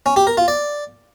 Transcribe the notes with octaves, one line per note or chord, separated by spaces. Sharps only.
C#4
G4
A#4
F4
D5